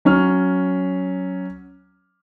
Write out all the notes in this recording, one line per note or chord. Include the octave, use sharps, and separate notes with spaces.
F#3 C#4 F6